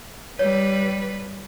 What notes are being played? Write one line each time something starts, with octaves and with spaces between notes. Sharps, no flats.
G3 B4 C#5